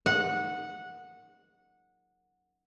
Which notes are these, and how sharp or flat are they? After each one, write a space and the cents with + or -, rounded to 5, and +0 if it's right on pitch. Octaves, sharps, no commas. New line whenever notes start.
F#5 -15